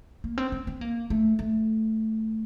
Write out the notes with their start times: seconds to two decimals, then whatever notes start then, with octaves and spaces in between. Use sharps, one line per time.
0.24 A#3
0.38 C4
0.52 C4
0.67 C4
0.81 A#3
1.10 A3
1.39 A3